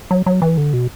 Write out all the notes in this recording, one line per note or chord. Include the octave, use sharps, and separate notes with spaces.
F#3
F#3
E3
D3
B2